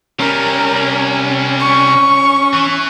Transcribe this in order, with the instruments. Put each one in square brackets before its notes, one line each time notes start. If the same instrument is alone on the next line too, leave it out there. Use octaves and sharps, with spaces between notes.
[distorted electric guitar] C3 G3 [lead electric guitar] C#4 [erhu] A#4
[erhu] C#6
[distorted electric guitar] E3